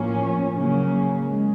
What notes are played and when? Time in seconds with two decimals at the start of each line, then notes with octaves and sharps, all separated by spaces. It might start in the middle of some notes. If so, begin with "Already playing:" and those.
Already playing: A2 F3 A#3 C#4
0.53 C#3 F#3 A#3 C#4
1.25 G#3